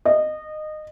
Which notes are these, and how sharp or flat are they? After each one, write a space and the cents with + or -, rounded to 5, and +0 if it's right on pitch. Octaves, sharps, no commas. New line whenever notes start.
D#5 -20